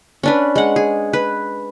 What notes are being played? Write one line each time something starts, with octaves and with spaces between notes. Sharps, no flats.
C#4 D4 B4
G#3 F#5
G#4
B4